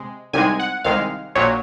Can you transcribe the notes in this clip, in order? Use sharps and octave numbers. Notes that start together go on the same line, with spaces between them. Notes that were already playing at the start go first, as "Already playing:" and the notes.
Already playing: C3 G#3
C2 C3 D#3 G#3 G#5
F#5
C2 C3 D#3 G#3 F5
A#1 A#2 F#3 C#5